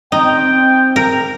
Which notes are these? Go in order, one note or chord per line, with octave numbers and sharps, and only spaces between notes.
C4 D#4 G5
A#4